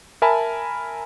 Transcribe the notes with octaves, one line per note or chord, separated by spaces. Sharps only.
A#4 E5 G#5 A5 B5